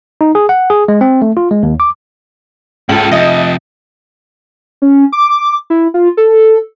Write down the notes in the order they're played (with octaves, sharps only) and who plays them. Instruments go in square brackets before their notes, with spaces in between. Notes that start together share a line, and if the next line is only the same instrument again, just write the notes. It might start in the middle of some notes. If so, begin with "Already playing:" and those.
[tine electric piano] D#4
G#4
F#5
G#4
G#3
C4
A3
F4
G#3
D#2
D6
[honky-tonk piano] C#2 F#7 [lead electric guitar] G#2 A4
[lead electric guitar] C3 F3 [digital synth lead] D#5 [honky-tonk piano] E5
[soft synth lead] C#4
D6
E4
F4
A4